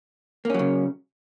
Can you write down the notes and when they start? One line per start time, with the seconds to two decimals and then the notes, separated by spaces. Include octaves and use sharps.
0.45 A#3
0.50 C#4
0.54 F#3
0.59 C#3